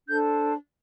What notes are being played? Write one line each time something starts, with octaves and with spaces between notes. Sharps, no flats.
D4 A4 C5 G6